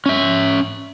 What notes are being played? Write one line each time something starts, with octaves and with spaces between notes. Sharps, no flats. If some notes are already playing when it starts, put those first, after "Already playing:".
C#4 E5